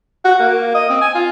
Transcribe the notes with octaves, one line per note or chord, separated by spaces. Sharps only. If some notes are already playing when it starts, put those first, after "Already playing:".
F#4
A#3
D#5
C4
G#5
F4